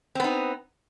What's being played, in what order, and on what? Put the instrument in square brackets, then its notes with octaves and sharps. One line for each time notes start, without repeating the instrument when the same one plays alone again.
[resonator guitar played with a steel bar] C4
B3
D#4